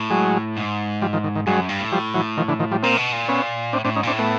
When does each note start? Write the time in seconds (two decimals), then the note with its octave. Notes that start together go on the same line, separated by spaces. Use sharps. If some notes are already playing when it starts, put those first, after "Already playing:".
Already playing: A2
0.10 F#3 G#3
0.57 G#2
1.02 F3 G3
1.13 D#3 F3
1.24 D#3
1.36 D#3
1.47 G2 F#3 G#3
1.58 F#2
1.69 G2
1.80 A2
1.92 F3 G3
2.14 E3 F#3
2.37 D#3 F3
2.49 D3 E3
2.59 D#3 F3
2.71 F3 G3
2.83 A#2 A#3 C4
2.97 B2
3.13 A#2
3.28 B3 C#4
3.73 A2 C4 D4
3.84 A2 C4 D4
3.96 G#2 C#4 D#4
4.03 A#2
4.07 A2 C4 D4
4.19 A3 B3